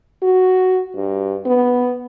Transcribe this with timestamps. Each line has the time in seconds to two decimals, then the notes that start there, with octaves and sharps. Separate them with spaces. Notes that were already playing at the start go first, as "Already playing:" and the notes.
0.22 F#4
0.95 G2
1.46 B3